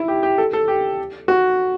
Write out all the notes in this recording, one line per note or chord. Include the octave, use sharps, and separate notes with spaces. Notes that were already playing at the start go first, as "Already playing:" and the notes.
Already playing: E4
G4
G4
A4
A4
G4
F#4